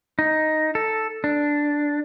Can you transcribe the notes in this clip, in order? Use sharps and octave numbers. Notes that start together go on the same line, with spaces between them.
D#4
A4
D4